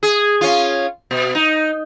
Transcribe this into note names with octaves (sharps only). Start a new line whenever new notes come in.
G#4
C#4 F4
B2
D#4